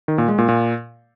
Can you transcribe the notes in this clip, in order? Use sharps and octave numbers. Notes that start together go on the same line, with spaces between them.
D#3
A#2
G#3
A#2
A#2